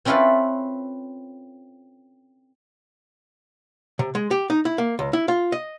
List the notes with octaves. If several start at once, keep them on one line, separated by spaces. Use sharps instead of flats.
C4 C#4 E4 F4 A4 B4
C3
G#3
G4
D#4
E4
A#3
C#2
E4
F4
D#5